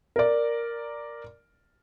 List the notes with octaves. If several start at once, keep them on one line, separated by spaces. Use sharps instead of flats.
A#4 D5